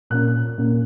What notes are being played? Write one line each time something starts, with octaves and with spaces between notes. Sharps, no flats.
A#2 A#3 C#4 F#6
A#2 A#3 C#4